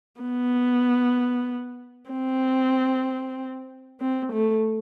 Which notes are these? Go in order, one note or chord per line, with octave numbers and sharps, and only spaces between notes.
B3
C4
C4
A3